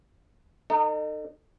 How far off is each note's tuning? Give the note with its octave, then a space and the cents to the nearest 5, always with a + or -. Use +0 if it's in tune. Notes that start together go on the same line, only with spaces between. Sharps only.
D#4 -30 A4 +35